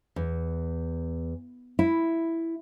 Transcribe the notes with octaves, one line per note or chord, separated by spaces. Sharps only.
E2
E4